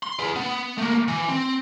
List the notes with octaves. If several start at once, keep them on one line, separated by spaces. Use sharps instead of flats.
C6
G#4 B4
B3
A3 A#3
E3
C4